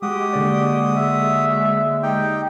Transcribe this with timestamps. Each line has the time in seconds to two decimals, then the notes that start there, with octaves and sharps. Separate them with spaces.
0.02 G#3 F#4 G4 D#6
0.33 D3 A#3 D5
0.96 E5
2.03 D#4 G4 G5